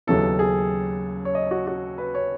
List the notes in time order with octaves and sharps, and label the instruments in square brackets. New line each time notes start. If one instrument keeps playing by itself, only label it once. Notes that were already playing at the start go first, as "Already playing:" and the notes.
[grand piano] D#2 C#3 F#3 B3 E4 A4
G#4
C#5
D#5
F#4
F#4
B4
C#5